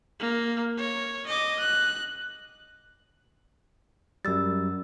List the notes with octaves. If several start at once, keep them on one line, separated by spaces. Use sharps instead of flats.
A#3
C#5
D#5 D6
F#6
F#2 G3 E6 A6